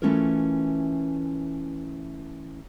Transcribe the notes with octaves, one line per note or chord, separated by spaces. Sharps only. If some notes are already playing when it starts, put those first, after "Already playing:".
E3 A3 C#4 E4 F4 A#4